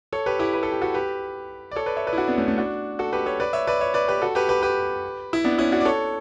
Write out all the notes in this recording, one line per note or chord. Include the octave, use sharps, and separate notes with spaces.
A4 C#5
G4 B4
E4 G4
B4
A4
G4
F#4 A4
G4 B4
D5
A4 C#5
B4 D5
C#5 E5
B4 D5
E4
D4 F#4
B3 D4
A3 C#4
A3
D4 F#4
F#4 A4
G4 B4
A4 C#5
B4 D5
C#5 E5
B4 D5
C#5 E5
B4 D5
G4 B4
F#4 A4
G4 B4
G4 B4
G4 B4
E4
B3 D4
C#4 E4
D4 F#4
D5
A4 C#5